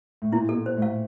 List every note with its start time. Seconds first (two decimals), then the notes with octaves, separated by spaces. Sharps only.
0.22 A2
0.32 A#2 E4
0.49 A4
0.54 A#2
0.66 C5
0.77 A2
0.82 F5